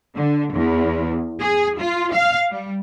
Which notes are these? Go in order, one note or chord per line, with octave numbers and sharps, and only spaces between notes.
D3
E2
G#4
F4
F5
G3